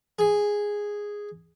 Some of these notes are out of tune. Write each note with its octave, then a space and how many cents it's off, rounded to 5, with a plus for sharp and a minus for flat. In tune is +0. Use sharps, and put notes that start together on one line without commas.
G#4 -5